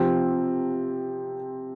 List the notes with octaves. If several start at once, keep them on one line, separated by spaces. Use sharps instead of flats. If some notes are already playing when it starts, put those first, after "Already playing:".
Already playing: C3 F3 C4